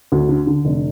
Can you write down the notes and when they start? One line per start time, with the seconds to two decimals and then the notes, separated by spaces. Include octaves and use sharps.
0.12 D2
0.29 D3
0.47 D3
0.65 F1